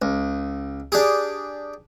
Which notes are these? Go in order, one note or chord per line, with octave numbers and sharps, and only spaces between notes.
C#2
D4 G4 G#4